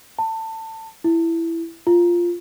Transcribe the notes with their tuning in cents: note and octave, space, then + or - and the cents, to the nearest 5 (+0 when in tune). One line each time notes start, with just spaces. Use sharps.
A5 +25
E4 +10
F4 -5